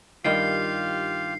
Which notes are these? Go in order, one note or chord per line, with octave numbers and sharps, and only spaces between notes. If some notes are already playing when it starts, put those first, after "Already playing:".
G2 D#3 F4 G4 F5 G5 C7